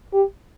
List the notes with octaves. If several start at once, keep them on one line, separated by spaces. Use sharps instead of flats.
G4